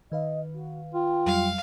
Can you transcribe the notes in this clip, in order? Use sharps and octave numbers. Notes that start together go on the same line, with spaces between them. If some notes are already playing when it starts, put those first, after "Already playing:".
D#3 B4 D#5 F5
F#4
F4 G5
F2 F#3 G3 F5